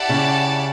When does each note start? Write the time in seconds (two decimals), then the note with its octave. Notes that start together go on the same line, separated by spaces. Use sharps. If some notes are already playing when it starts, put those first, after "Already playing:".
Already playing: E4 G4 D5 F#5 A5
0.09 C#3